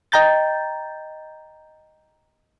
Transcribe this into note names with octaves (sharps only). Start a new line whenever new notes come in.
D#5 G5 A#5 G6 A6